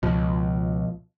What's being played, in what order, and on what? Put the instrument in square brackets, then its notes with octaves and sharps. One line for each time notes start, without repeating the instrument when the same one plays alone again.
[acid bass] C#2 [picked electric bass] B2 F3